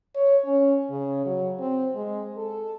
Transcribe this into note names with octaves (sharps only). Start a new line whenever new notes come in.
C#5
C#4
C#3
F#3
C4
G#3
A4